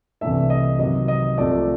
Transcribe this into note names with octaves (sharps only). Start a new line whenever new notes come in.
C2 C3 E3 A3 D4 E5
D#5
C3 D#3 F#3 D#5
D#5
C2 C3 F3 A3 D5